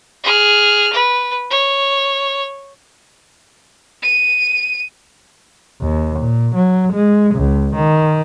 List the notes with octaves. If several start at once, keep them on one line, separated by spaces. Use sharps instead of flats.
G#4 F6
B4
C#5
D#7
D#2
A#2
F#3
G#3
C#2
D#3